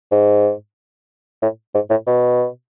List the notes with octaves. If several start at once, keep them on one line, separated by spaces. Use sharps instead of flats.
G#2
A2
G#2
A2
B2